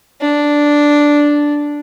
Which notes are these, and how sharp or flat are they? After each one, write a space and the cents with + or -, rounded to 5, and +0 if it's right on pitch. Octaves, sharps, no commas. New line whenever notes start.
D4 -5